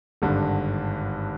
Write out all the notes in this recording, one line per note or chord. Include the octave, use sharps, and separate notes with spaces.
G#1 G2 D3